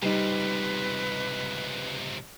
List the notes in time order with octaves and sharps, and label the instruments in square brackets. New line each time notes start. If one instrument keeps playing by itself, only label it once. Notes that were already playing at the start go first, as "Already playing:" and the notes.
[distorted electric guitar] C#2 C3 [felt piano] G3 D#4 [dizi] B4